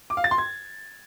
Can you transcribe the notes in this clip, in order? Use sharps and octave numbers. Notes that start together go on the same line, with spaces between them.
D6
F5
A6
C6
G#6